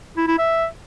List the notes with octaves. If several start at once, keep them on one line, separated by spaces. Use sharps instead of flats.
E4
E4
E5